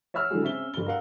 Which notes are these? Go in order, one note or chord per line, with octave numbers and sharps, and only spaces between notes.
C#5 E5 F#5 E6 F6
D3 F#3 G#3 E4 G#4
C#3 C4 C#4 E5 G7
G1 G7
A#4 F5 F#5